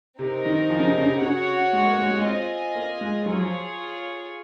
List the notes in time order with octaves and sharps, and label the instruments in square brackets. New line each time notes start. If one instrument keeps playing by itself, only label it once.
[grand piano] C3 [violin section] C4 D#4 A#4
[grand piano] D#3
F3
C#3
C3
C#3
C3
C3
[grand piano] C#3 [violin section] F#4 C#5 F#5
[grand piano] G#3
A#3
G#3
G#3
[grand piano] C4 [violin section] F4 G#4 D#5 G#5
[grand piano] A#3
G#3
[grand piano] F#3 [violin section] F4 G#4 C#5
[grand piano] F3